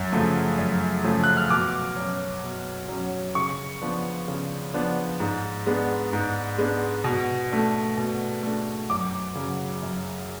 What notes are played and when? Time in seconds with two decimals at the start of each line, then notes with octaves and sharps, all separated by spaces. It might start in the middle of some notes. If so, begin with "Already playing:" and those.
Already playing: F#2
0.12 C#3 F3 A3
0.58 F#2
1.04 C#3 F3 A3
1.24 F#6
1.37 F6
1.50 B2 D6
1.96 F#3 C#4
2.43 B2
2.89 F#3 C#4
3.35 C#3 C#6
3.82 F3 B3 D4
4.28 C#3
4.74 F3 B3 D4
5.20 G#2
5.67 G#3 B3 D4
6.13 G#2
6.58 G#3 B3 D4
7.04 B2
7.52 A3 D4
7.97 B2
8.43 A3 D4
8.90 F#2 D6
9.36 C#3 F#3
9.82 F#2